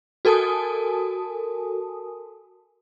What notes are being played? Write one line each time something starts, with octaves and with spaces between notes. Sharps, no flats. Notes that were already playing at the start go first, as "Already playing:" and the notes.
F#4 A4 A#4 G#5 A5 D#6